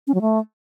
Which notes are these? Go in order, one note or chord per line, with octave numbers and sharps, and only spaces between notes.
C#4
F#3
A3